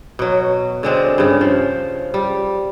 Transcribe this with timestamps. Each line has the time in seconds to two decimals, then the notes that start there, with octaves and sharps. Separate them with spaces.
0.19 B2 F#3
0.83 D3 G#3 C4 D4
1.18 G2 C#3
1.41 F3
2.14 G3